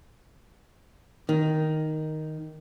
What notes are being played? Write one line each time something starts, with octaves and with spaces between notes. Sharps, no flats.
D#3